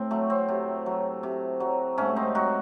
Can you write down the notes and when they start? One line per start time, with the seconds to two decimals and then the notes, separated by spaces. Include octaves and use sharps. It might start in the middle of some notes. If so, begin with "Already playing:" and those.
Already playing: A2 C4
0.11 F#3 A3
0.30 C4
0.48 C3
0.86 F#3
1.23 C3
1.60 F#3
1.97 G#2 A3 C#4
2.16 C4 D#4
2.35 F#3 D#4 F#4